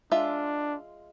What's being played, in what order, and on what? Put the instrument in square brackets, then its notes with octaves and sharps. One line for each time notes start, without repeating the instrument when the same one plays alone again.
[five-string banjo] G#3 F4 E5 [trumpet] D4